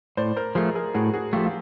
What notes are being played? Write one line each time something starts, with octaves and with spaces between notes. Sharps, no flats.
A2 C5 D5
A#4 C5
F3 A3 G#4 A#4
G#4 A#4
A2 F#4 G#4
F#4 G#4
F3 A3 F4 G4
F4